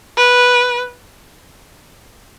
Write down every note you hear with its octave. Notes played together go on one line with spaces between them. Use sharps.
B4